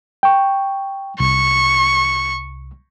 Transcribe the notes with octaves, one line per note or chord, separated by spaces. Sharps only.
G5 C#6
C2 C#6